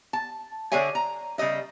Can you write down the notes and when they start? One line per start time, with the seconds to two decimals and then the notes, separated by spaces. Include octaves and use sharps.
0.13 A5
0.72 D3 D4 G#4 C#5 E5 G#5
0.95 A#5
1.38 C#3 G3 D#5 E5